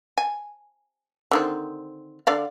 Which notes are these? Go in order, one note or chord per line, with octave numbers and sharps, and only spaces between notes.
G#5
D3 D#3 C4
D3 D5 F5